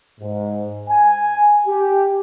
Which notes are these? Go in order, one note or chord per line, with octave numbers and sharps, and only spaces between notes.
G#2
G#5
G4